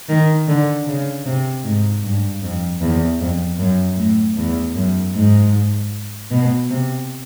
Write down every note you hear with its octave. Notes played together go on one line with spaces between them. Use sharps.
D#3
D3
C#3
C3
G#2
G2
F2
E2
F2
F#2
A2
E2
F#2
G#2
B2
C3